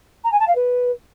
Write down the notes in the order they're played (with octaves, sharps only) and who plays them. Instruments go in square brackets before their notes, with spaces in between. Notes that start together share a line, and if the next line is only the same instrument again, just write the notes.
[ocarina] A#5
G#5
A5
F5
B4